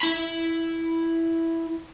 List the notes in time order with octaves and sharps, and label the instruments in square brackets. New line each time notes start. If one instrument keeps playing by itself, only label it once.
[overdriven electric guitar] E4 B5